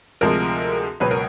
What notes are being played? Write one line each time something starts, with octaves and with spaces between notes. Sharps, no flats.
D2 C3 F3 G#3 A#4
C#2 B2 F#3 B4
A#4